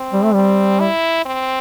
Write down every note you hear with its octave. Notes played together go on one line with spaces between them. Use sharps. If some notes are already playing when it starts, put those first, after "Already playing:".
Already playing: C4
G3
A3
G3 C4
E4
C4